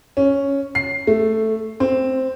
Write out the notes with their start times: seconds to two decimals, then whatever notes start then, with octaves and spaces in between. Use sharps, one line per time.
0.17 C#4
0.75 C7
1.07 A3
1.80 C4